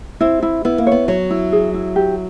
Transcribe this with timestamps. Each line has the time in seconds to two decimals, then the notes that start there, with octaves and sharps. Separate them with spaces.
0.21 C4 E4
0.42 E4
0.65 B3 E4
0.78 A#3
0.87 B3 C#5
1.08 F#3 C#5
1.31 E4
1.52 G#4
1.74 E4
1.96 G4